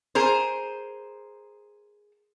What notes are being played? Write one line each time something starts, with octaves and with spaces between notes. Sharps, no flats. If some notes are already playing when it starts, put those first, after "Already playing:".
G#4 A#4 C5